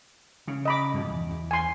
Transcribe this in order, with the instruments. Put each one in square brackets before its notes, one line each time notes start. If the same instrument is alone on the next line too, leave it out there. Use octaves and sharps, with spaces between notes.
[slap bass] C#3
[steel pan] D#5 B5 D6
[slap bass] G2 B2 F3
E2
E2
[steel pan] G#5 C6